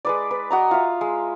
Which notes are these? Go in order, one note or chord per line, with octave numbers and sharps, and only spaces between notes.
G#3 B4 D5
B4
F#4 D#5 A#5
F4 E5
G#3